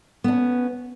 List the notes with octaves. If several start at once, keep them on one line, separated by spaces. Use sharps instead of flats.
B3 C#4 D4